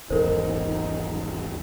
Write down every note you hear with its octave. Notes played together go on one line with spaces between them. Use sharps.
D#1 G#1 E2 D#4 A4 A#4 C5